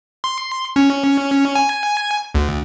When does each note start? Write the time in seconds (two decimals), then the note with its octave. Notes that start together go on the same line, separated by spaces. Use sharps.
0.24 C6
0.76 C#4
1.55 G#5
2.35 D2